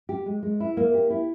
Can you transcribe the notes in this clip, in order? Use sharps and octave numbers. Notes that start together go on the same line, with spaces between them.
G4
G#3
G#3
E4
A#3
G4
E4